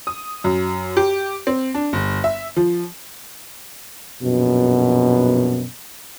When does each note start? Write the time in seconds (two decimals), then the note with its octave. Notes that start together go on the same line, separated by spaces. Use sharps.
0.07 D#6
0.44 F#2
0.97 G4
1.47 C4
1.75 D4
1.93 G1
2.24 E5
2.56 F3
4.23 A#1 F#2 B2